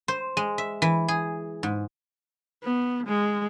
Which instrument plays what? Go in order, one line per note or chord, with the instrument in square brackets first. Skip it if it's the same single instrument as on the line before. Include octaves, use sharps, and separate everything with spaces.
[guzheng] C5
G#3
E5
E3
G#4
G#2
[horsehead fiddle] B3
G#3